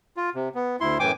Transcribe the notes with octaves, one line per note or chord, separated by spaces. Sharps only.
F4
C3
B3
D2 E4 C6
F#2 A2 E3 G5 G#5 D6